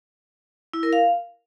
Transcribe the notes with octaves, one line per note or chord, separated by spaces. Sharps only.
E4
A#4
F5